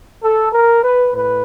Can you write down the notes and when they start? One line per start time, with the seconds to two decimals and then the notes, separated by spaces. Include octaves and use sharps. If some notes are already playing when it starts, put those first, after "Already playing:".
0.23 A4
0.53 A#4
0.84 B4
1.14 A2 B4